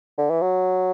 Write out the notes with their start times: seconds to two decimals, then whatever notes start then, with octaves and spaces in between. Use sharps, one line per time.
0.18 D3
0.30 E3
0.42 F#3